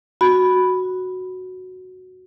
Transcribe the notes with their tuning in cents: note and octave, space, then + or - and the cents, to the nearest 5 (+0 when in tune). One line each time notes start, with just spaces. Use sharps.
F#4 +0 B5 +0